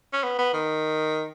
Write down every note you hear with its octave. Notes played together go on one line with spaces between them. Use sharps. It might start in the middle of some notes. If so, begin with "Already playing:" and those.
C#4
B3
B3
D#3